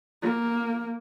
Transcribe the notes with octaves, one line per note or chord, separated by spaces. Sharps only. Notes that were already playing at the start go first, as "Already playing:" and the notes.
A#3